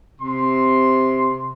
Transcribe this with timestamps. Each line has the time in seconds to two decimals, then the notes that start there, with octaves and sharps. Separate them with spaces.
0.22 C3 C6